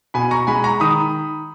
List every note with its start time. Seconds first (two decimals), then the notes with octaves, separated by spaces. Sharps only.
0.14 B2 G#5 B5
0.31 A#5 C#6
0.47 G#3 G#5 B5
0.64 A#5 C#6
0.80 D#3 B5 D#6